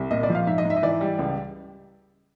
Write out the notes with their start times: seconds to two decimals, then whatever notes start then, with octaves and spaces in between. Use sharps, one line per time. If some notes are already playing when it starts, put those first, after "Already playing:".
Already playing: C2
0.11 A#2 D#5
0.23 D5
0.29 F3
0.35 F5
0.47 G#2 E5
0.58 D#5
0.65 G#2 E5
0.76 D#5
0.83 E3 D5
1.01 G3
1.19 C#2